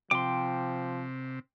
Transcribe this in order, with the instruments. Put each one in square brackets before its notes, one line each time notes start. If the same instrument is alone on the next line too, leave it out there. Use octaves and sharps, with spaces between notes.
[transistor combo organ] C3 [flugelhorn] F3 [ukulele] G5 [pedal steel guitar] C6 D6